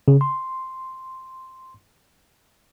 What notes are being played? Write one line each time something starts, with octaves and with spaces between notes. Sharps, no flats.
C#3
C6